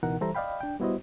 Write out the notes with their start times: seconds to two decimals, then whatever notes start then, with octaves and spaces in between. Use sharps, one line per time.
0.03 C#2 B2 E3 D#4 A#4 F#5
0.21 E3 G3 A4 C5 E5 A#5
0.35 D5 D#5 F5 G5 B5
0.61 D4 G5
0.80 G3 B3 E4 F#4 C5 D#5